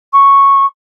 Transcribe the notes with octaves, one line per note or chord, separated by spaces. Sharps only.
C#6